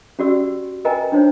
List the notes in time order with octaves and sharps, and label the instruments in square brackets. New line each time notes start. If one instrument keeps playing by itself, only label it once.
[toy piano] C#4 F#4 G4 D5 E6
A#4 B4 D#5 G5 G#5 A#5
D4 D#4 C5 C#5